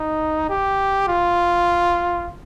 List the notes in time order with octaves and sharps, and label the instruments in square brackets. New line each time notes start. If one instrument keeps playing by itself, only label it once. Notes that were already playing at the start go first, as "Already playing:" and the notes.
Already playing: [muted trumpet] D#4
G4
F4